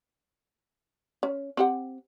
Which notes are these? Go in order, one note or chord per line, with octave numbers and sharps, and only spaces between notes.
C#4
C4 G4 F#5